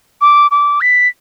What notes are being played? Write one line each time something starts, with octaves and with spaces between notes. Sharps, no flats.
D6
D6
B6